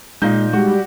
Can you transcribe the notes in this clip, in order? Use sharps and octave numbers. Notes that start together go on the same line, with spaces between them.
A#2 G#3 D#4 D#5 F5 G6
G3 G#3 F#4 G4